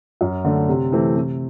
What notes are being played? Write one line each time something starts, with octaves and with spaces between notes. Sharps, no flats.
F#2
D3 A3
C3
E3 A3 C4
C3